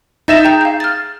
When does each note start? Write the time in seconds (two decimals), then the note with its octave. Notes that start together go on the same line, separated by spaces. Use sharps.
0.28 D#4 E5 G6 A6 A#6 E7
0.45 G#4 G5 A#5 G6
0.61 F5 G6
0.80 F6 A6